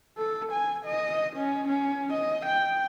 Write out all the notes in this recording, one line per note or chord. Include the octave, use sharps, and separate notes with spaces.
A4
G#5
D#5
C#4
C#4
D#5
G5